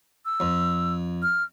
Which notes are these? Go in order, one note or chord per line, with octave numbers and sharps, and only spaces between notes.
E6
F2
F6